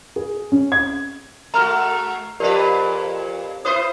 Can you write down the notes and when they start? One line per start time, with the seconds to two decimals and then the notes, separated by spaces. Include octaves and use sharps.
0.16 G#4
0.52 C#4
0.72 G#6
1.54 G#3 F#4 A#5 F6
2.40 F2 A#2 G4 A#4 B4 D5
3.65 E4 B4 C5 D#6